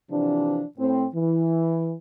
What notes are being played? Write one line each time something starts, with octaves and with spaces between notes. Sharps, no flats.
C3 E3 F3 D4
A2 C4
E3